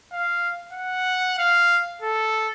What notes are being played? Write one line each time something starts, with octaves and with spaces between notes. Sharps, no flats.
F5
F#5
F5
A4